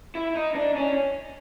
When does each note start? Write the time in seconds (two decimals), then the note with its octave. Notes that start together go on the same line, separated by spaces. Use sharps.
0.15 E4
0.36 D#4
0.55 D4
0.76 C#4